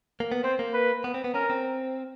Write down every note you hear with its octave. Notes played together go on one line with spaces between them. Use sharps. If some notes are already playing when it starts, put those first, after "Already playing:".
A#3
B3
C4 C5
A#3
B4
B3
C4
B3
C#4 A#4
C4